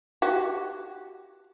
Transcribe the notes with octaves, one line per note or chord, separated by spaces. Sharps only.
F#4 G4